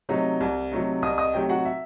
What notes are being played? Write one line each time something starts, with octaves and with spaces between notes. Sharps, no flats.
C3 F#3 A3 D#4
C2
C3 F#3 A3 D#4
C2 D#5 D#6
D#5 D#6
C3 F#3 A3 D#4 G4 G5
F#4 F#5
E5